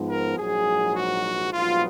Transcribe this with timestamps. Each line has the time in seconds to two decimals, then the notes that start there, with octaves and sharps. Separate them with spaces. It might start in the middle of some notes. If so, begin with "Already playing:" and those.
Already playing: G#2 F3 B3
0.09 A#4
0.38 A#1 G#2 F#3 G#4
0.96 F#4
1.53 A#1 G#2 F#3 B3 F4